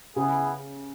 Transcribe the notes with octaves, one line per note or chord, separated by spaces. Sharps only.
C#3 B3 E4 G#4